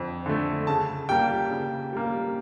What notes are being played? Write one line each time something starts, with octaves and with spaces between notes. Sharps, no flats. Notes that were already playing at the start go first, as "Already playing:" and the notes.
Already playing: F2 D3
D3 A3
C#3 A5
G3 A#3 G5
C#3
G3 A#3